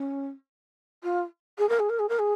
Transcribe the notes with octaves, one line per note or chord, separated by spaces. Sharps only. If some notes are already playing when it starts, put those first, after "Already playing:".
Already playing: C#4
F4
G#4
A#4
G#4
A#4
G#4
A#4
G#4